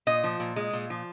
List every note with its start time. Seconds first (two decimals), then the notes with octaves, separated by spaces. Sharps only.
0.07 A#2 D#5
0.24 F3
0.40 A#2
0.56 G#3
0.73 A#2
0.90 F3